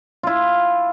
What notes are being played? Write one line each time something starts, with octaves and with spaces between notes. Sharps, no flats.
E4 F4